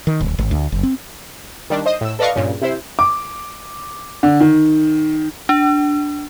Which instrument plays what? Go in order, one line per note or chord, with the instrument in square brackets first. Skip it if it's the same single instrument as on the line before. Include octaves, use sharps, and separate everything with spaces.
[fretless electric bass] D#3
D1
G#1
D2
F#1
C4
[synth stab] D#3 G3 D4
C5 D#5 D#6
A2 E6
A4 B4 D5 D#5 F5 C#6
G2 A#2 C#3
C3 E4 C5
[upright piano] D6
D3
D#3
[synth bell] D4